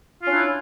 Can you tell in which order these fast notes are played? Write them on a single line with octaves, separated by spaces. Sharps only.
F4 C#4 D4 E4